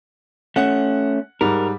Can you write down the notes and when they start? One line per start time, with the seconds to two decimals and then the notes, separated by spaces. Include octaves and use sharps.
0.56 A3 C#4 F#5 F#6
1.41 G#2 G3 A#4